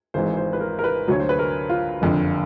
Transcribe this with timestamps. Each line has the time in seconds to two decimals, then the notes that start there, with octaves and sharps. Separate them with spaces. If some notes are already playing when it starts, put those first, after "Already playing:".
0.14 G#1 G#2 E3 C5
0.37 C5
0.53 B4
0.60 A#4
0.79 A#4
0.84 B4
1.08 D2 D3 F#3 C#5
1.20 C5
1.29 B4
1.39 A#4
1.69 F4
2.01 F#1 F2 D3